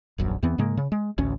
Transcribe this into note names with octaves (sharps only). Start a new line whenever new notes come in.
D#1 A#1 F#2
E2 E3 B3 C4
G#2 C#3 G#3 A#3
C#3
G#3
A1 D2 C#4